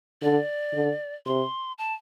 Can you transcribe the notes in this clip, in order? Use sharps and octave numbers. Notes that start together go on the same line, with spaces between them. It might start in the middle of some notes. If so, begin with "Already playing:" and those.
D3 D5
D3
C3 C6
A5